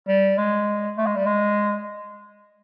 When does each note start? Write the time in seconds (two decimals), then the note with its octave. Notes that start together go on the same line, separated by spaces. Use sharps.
0.08 G3
0.38 G#3
0.97 A3
1.06 G#3
1.16 G3
1.26 G#3